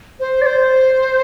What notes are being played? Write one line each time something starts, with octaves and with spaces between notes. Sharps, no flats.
C5
D5
C5